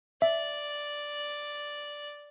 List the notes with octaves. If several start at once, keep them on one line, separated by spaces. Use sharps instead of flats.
D5 E5